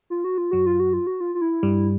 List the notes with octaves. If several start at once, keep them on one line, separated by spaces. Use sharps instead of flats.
F4
F#4
F4
F#2 F#3 F#4
F4
F#4
F4
F#4
F4
F4
E4
G2 G3